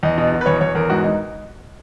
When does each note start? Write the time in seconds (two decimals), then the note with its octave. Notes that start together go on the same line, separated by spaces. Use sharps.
0.03 E2 D#5
0.18 B2
0.32 B2
0.41 B4
0.46 E2 C#5
0.61 E2 C#5
0.75 E2 A#4
0.90 G#2 F#4
1.04 G#2 D#4